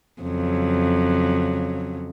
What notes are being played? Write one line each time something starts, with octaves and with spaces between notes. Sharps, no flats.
F2 C#3 F#3